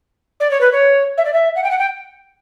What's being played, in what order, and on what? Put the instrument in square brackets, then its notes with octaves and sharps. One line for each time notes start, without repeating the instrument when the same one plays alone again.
[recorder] D5
C#5
B4
C#5
E5
D5
E5
F#5
G5
F#5
G5